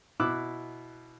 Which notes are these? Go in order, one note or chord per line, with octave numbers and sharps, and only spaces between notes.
B2 E4 D6 E6 F#6